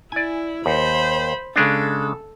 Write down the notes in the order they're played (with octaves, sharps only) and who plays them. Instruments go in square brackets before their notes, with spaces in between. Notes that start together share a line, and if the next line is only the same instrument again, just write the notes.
[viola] E4 [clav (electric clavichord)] D5 G#5
[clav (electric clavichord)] D#2 [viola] C5 B5
[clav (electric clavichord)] C#3 G#3 D4 [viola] A4